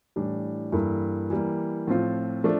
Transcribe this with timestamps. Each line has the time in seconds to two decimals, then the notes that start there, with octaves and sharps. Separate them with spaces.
0.16 A2 E3 G3 D4
0.72 G2 E3 A#3 E4 A4
1.30 E3 G3 A#3
1.87 A2 F3 C4 F4
2.44 F3 A3 D4